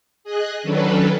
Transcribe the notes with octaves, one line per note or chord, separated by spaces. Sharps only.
G#4 D#5 F#6
D#3 F#3 C#4 D4 A4 B4